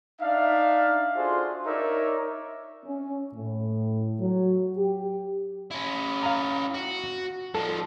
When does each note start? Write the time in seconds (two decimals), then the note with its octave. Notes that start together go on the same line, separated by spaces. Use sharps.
0.21 D4 D#4 E5 F5
1.16 D4 F4 F#4 G#4 A4 C5
1.66 D#4 A#4 C#5 D5 E5
2.85 C#4
3.34 A2
4.20 F#3
4.77 G4
5.71 C#4 E4
6.23 F5 A#5
6.74 F#4
7.55 F3 G#3 A4